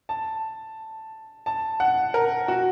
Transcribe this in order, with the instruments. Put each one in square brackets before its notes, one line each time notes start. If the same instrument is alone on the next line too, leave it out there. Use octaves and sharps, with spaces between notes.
[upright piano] A5
A5
F#5
A#4
F#4